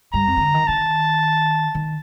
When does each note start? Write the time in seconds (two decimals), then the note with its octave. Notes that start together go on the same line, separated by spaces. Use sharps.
0.14 G2 A#5
0.27 F2
0.37 D#3
0.41 D3
0.54 D#3
0.67 D#3 A5
1.75 D#3